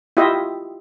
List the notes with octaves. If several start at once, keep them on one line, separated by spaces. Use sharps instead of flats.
E4 F4 G4 D#5 E5